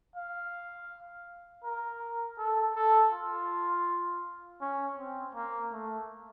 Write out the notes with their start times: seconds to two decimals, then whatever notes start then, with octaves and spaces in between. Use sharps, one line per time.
0.16 F5
1.64 A#4
2.38 A4
2.75 A4
3.12 F4
4.61 C#4
4.98 C4
5.35 A#3
5.72 A3